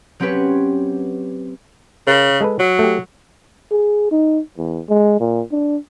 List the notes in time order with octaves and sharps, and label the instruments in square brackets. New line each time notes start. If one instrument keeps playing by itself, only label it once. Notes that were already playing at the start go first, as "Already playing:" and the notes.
[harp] F#3 C4 C#4 G4 B4 C#5
[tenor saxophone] C#3 [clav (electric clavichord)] A#4
[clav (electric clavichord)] G#3 A4 B4
[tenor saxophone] F#3 [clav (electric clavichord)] C#5
[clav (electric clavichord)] A3 G4
[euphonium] G#4
D#4
E2
G#3
A#2
D4